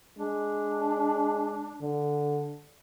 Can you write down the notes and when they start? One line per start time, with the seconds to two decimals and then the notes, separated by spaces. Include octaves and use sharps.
0.19 G#3 D4
1.82 D3